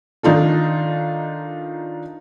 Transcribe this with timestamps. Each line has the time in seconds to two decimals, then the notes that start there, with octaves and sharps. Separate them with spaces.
0.23 D#3 D4 D#4 F4 A4